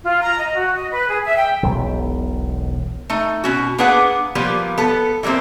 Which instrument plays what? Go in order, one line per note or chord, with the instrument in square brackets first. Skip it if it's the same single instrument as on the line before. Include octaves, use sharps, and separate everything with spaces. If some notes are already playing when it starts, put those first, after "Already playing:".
[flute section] F4
A#5
D#5
F#4
D#5
B4
G#4
E5
G5
[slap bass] E1 B1
[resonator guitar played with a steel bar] A3 D#4
B2 C#4 F#4
A#3 B3 D4 G#4 B4 F#5
F3 G3 A#3 B3
B3 A4
E3 G3 A3 A#3 C4